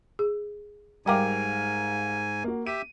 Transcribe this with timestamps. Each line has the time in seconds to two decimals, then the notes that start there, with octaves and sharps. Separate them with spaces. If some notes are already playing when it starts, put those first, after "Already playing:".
0.19 G#4
1.06 G#2 G3 G4 A#4 F5 G5 G#5 D6
2.44 A#3 F#4
2.66 G4 E5 D#7